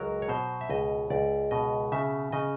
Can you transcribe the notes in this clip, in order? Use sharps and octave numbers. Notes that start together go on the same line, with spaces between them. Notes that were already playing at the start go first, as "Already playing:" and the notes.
Already playing: C#2 F#3 A#4
C#5
B2 C5
E5
C#2 D#5
C#2 D5
B2 D#5
C#3 E5
C#3 D#5